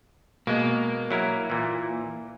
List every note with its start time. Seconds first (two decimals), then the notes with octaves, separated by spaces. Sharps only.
0.47 B2 G#3 A#3
1.11 F#3 E4 A#4
1.50 A#2 E3